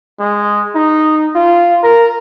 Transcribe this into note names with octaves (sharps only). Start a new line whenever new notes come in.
G#3
D#4
F4
A#4